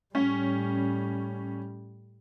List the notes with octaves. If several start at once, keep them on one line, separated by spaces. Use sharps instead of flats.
A2 G3 C#4